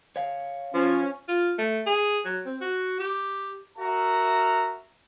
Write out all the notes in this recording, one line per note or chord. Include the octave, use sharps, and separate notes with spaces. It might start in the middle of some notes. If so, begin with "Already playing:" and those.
C#5 F5
F3 C#4
F4
A3
G#4
F#3
C4
F#4
G4
F#4 A#4 E5 A#5